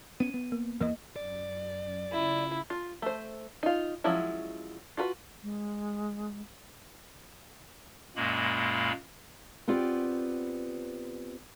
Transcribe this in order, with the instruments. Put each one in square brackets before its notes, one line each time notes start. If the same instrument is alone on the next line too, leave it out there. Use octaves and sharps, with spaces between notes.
[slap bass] B3 C#4 [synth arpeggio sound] D#7
[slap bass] B3
[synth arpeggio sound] A#3
[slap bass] E2 E3 [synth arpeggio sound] A#3 D#5
[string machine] F#2 [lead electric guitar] D5
[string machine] C#3 F4 [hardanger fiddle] E4
[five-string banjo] F4
A3 C5
D#4 F4
F3 F#3 G#3 C#4 E4
F4 F#4 G#4 B4
[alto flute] G#3
[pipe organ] F#2 A#2 G#3 A#3 B5
[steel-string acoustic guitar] B3 C4 F4 G4 D5